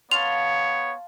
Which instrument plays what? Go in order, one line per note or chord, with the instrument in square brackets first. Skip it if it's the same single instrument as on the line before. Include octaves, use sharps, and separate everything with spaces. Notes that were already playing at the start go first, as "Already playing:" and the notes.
[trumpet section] B3 C#5 [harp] F5 A5 C6 [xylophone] F7